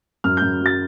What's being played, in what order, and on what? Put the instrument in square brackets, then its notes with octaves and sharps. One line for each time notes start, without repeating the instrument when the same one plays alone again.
[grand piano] F#2 F6
G6
F#2
F#3 A6